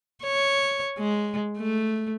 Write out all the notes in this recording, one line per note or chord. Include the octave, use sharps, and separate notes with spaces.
C#5
G#3
A3